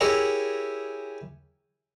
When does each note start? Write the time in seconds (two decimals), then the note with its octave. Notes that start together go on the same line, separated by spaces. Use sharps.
0.01 E4 G4 G#4 A#4 C#5 E5